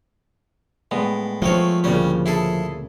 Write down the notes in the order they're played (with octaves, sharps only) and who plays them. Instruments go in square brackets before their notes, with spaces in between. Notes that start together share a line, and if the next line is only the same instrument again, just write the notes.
[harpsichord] A2 [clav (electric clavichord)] G3 G#3 B3
[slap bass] F3 [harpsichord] A3 C4 C#5
[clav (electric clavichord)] D2 A#2 C#3 [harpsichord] G3 C#4
[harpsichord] E4 G#4 A4